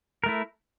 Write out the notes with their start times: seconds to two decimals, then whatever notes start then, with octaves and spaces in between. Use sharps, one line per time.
0.24 A#4
0.26 A3
0.29 E4